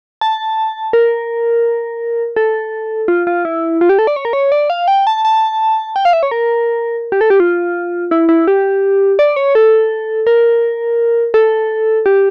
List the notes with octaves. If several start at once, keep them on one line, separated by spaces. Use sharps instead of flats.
A5
A#4
A4
F4
F4
E4
F4
G4
A4
D5
C#5
A#4
C#5
D5
F5
G5
A5
A5
G5
F5
E5
C#5
A#4
G4
A4
G4
F4
E4
E4
G4
D5
C#5
A4
A#4
A4
G4